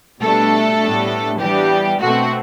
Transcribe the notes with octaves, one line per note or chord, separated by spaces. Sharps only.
B2 G3 A3 D4 A4
A2 G3 B3 D4
E3 G3 B3 D4 G4
B2 A3 C4 F#4